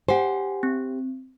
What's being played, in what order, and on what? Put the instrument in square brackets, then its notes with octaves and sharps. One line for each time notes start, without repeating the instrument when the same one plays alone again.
[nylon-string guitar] G4 C5 [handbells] F#5 G#5
[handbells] C4